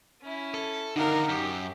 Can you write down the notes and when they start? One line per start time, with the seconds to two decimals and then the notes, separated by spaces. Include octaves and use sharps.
0.22 C#4 E4
0.54 A4
0.96 D3 D#3 D#4 A#4 F5 F#5
1.29 F#2 G4